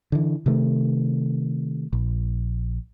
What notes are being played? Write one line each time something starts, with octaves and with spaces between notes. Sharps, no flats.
D3 E3
C3 D#3 A3
A#1